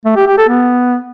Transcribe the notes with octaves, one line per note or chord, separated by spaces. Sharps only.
A3
G4
G4
A4
B3